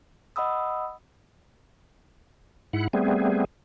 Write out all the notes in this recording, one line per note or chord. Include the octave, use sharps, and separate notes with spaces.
D#5 F#5 B5 D#6 E6
G#2 E4 F#5
G3 A3 B3 C4 G#4